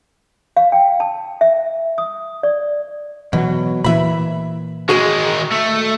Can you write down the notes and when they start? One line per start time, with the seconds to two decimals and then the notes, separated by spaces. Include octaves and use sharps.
0.57 F5
0.72 G5
1.00 A5
1.41 E5
1.98 D#6
2.43 D5
3.33 B2 E3 F#3
3.84 A#2 E3 E5 B5
4.89 D#3 G#3 F#4 G#4 G#5
5.51 A3